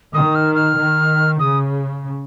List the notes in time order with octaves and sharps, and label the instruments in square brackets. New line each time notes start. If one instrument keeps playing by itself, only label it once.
[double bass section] D#3 [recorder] D#6
[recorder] F6
F6
[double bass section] D#3
[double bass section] C#3 [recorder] D#6